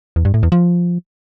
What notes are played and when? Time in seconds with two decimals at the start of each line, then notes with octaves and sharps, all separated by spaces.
0.16 E2
0.25 G2
0.34 A2
0.43 E2
0.52 F3